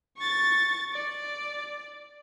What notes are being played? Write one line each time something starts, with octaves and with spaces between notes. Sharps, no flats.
C#6 A6
D5